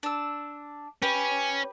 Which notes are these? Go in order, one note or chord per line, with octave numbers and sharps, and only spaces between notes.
D4 E6
C#4 G4 B4